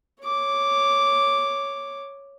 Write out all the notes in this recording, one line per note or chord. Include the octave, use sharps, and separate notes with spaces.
C#5 D6